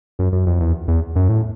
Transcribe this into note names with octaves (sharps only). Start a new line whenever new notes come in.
F#2
F#2
F2
E2
E2
F#2
A2